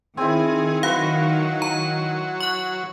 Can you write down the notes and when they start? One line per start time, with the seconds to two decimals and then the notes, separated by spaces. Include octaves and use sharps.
0.17 D#3 C4 E4 G#4
0.83 F#3 B4 F5
1.62 A#5
2.40 C#6 F#6